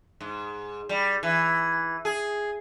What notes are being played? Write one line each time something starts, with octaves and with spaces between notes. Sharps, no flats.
G#2
G3
E3
G#4